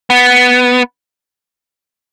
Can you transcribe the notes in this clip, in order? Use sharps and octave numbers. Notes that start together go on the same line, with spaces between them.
B3